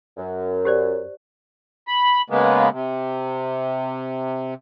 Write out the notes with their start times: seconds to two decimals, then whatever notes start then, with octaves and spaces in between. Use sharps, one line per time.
0.17 F#2
0.65 G4 C5 D5
1.88 B5
2.30 C#3 G#3 A#3 B3
2.71 C3